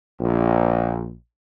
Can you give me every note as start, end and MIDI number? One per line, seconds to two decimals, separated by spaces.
0.20 1.11 34